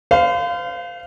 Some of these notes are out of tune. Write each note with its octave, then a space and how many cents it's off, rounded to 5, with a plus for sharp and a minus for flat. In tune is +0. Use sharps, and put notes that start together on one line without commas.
C5 -40 F5 +0